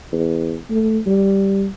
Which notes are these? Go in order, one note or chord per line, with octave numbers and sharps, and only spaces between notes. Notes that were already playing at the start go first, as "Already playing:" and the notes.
E2
A3
G3